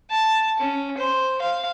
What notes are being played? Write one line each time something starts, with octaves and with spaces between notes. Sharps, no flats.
A5
C#4
C5
F5